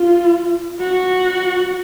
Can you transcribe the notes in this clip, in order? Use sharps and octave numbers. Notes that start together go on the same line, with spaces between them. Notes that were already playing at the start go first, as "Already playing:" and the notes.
Already playing: F4
F#4